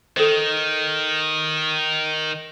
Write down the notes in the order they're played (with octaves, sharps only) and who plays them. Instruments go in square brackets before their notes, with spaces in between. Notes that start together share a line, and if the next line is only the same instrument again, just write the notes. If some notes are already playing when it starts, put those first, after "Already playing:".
[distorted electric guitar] D#3 [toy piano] A4 C5